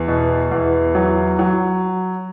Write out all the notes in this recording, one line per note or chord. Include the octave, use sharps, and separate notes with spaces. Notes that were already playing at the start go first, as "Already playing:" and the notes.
Already playing: E2
B2
E2
F#3
F#3